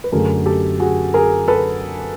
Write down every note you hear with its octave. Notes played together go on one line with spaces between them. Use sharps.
B4
F#2 D3 F#3 A3 G#4 A#4
G4 A4
F#4 G#4
G#4 A#4
A4 B4